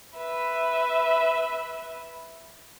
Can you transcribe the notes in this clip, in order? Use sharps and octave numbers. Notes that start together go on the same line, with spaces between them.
B4 E5